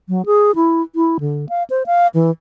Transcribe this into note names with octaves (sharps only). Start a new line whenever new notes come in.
F#3
G#4
E4
E4
D3
F5
C5
F5
E3